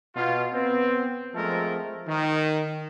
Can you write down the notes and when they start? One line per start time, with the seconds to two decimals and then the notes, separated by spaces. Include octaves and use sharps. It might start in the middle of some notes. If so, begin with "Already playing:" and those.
0.16 B2 F4
0.53 B3 C4
1.35 F3 G#3 A3 C4 A4 A#4
2.06 D#3